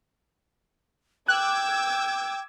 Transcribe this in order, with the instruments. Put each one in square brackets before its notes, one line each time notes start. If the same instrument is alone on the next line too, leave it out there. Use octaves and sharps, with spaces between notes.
[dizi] G5 [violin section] D6 E6 G#6 [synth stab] F#6